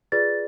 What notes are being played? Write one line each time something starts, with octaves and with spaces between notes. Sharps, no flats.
F4 G#4 B4 D5 A6